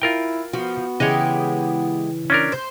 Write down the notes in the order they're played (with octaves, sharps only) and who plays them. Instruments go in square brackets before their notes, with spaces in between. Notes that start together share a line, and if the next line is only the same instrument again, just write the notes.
[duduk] E4 [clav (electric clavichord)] F4 A#4 G5
[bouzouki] F3 [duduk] B3 [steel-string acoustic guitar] F#4
[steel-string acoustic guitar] C#3 E3 [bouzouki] G#3 E4 G4 [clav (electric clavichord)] C#5 D#5
[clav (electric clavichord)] C#4 D4 A#4
[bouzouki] C5